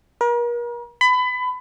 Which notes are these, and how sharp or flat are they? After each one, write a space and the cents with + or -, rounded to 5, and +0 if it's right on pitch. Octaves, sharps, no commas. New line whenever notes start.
A#4 +40
B5 +25